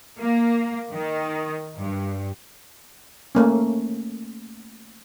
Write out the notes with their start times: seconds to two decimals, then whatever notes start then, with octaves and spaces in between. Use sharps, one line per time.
0.18 A#3
0.92 D#3
1.78 G2
3.35 A3 A#3 C#4